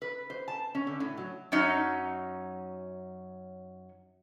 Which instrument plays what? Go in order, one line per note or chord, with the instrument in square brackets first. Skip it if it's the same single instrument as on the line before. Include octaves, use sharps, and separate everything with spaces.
[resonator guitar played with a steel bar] B4
C5
A5
C#4
D3
A2
F#3
F#2 F#3 C#4 D#4